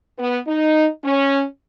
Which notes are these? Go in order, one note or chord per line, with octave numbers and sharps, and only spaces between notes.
B3
D#4
C#4